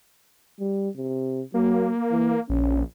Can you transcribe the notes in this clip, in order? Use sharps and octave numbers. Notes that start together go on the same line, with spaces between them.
G3
C3
F#3 A#3
E3
A#1 C#4